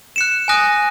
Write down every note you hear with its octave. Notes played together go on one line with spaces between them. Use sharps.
F#6 C#7 E7
G#5 D#6 F#6 A#6 D#7